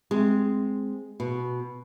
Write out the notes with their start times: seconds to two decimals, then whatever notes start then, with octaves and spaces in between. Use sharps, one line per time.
0.11 G#3 C4
1.20 B2